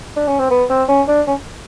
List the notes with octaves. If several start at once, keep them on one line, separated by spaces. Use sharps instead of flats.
D4
C#4
C4
B3
C4
C#4
D4
C#4